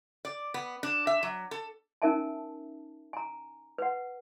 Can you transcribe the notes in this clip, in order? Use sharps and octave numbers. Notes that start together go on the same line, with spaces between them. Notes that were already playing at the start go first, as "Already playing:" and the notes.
D5
B3
D4
E5
F#3
A4
C#4 D#4 A#4 E5 G#5 A5
G#5 A#5
B4 F#5